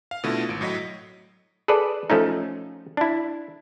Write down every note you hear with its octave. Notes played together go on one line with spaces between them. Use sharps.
F5
B2 D3 A3 E4 F4
G#1 D7
A2 F#3 D#5 B6
G#4 A4 B4 D5
F3 A3 C#4 D#4
D4 E4